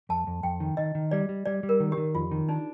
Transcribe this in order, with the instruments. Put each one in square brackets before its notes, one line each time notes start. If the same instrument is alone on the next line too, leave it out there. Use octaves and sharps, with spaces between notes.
[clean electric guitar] F2 [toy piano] A5
[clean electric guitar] F2
[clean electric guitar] F2 [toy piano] G5
[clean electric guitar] D#3
[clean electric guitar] D#3 [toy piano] D#5
[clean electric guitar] D#3
[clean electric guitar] G3 [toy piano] D5
[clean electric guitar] G3
[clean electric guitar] G3 [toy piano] D5
[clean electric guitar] G3
[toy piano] A#4
[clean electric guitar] D#3
[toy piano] G4
[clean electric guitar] D#3
[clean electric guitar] F2 [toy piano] F4
[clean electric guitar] D#3
[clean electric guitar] D4 [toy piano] D#4